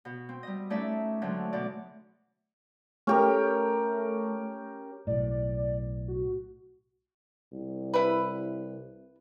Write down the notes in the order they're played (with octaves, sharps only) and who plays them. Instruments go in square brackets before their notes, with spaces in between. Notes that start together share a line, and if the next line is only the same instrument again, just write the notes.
[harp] B2
C4
G3 D#5
A3 C#4 D#4 D5 E5
G#2 D3 F#3 A3 C4
B2 D5
[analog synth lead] A3 [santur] C#4 G4 A#4
[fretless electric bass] B1 A2 [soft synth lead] D5
[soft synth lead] F#4
[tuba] C2
[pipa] E4 B4